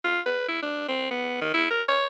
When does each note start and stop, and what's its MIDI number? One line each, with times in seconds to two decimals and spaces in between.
0.05 0.20 65
0.26 0.46 71
0.49 0.62 64
0.63 0.85 62
0.89 1.08 60
1.11 1.37 59
1.41 1.52 51
1.54 1.70 64
1.70 1.82 70
1.88 2.06 73